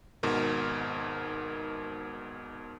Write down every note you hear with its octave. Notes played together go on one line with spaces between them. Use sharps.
G#1 G#2 B2 A#4